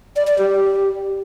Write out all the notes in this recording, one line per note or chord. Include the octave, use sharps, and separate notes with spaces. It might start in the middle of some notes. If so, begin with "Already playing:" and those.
D5
D5
G4